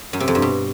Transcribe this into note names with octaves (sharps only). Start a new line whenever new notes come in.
F#2
C3
F2
G2
B2